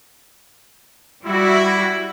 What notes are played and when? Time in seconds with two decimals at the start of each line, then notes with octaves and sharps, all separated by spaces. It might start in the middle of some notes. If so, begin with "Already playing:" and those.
1.25 G3 E4 F#4